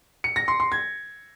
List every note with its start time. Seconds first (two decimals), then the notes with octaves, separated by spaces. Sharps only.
0.24 C#7
0.36 A#6
0.48 C6
0.60 C6
0.72 G#6